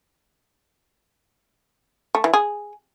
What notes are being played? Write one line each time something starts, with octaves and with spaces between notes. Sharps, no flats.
A3
E3
G#4